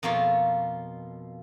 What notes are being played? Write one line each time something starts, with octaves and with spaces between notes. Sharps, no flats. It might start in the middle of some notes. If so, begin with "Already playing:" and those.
F2 B2 A#3 F4 C#5